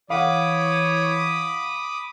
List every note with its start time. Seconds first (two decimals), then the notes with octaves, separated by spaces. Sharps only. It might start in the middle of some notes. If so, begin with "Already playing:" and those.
0.10 E3 C#5 F5 F#5 B5 D6 D#6